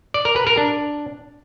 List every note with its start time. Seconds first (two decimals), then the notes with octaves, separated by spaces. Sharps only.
0.14 D5
0.25 A#4
0.36 B4
0.47 A#4
0.57 D4